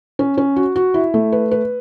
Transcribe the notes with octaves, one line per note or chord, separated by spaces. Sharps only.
C#4
C#4
F#4
F#4
E4
A3
B4
B4